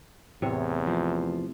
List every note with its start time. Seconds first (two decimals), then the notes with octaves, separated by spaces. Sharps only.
0.42 E2 A2 C3 C#5
0.87 F3